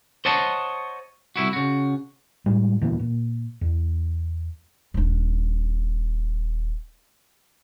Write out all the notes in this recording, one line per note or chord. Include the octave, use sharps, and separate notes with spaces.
C5 C#5 D#5 F#5 A5
C2 E4 F#4
C#3 F#4
A2 G3 G#3
D2 A#2 E3 B3
A#2
E2
D#1 D4